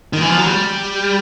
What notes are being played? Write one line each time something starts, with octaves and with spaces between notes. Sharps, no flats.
D#3
E3
F3
F#3
G3